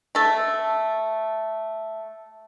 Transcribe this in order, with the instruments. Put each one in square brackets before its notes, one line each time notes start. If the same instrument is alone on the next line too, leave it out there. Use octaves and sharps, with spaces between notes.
[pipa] A3 A4